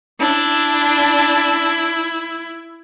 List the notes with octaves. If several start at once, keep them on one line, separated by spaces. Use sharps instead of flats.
D4 E4